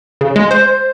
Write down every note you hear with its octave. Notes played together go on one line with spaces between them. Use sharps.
C#3
G#3
C5